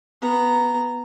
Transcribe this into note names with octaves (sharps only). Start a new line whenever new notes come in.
B3 A#5